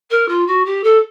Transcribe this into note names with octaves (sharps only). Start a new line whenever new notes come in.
A#4
F4
F#4
G4
A4